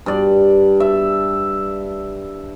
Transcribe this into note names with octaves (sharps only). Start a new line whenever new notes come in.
G2 D5
E5